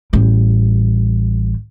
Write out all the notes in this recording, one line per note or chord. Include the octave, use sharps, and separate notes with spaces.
A1 G3